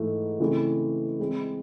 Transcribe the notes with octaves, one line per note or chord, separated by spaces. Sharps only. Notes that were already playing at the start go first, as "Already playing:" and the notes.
Already playing: G#2 E3 A3
C#3 E3 A3 C4 E4
E3 G#3 C4 E4